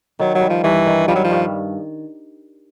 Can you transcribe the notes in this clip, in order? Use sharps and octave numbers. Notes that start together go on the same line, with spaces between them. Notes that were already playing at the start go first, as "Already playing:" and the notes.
D#3 F#3
F#3
G3
F3
G2 E3
D#3
F3 G3
F#3
F3
G2